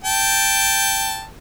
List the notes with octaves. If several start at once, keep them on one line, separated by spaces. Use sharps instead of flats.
G5 A5